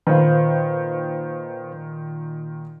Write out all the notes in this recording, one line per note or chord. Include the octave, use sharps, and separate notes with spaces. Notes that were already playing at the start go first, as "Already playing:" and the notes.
A#2 D#3 B4 C5 F5